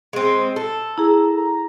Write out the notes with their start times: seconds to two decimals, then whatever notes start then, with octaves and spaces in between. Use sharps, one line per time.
0.13 G#3 C4
0.56 A4
0.98 E4 G#4 A#5
1.36 A#5